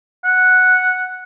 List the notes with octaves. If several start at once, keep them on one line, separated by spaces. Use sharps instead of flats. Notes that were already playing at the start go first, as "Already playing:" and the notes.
F#5